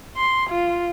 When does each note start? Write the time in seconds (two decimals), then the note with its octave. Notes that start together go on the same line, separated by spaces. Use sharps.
0.17 C6
0.50 F4